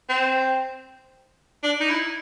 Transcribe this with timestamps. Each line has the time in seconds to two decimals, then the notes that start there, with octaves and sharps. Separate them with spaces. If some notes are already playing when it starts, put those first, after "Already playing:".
0.09 C4
1.63 D4
1.80 D#4
1.89 E4